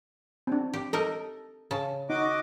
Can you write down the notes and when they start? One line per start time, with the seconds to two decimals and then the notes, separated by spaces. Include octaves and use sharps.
0.47 C4 D4
0.73 G4
0.93 D#4 A4 A#4 D#5
1.71 C#3 A5
2.10 D#4 F#4 D#5 D6